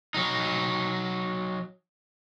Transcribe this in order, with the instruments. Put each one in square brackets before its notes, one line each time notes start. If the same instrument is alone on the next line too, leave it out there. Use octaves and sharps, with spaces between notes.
[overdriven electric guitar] F#3 D#4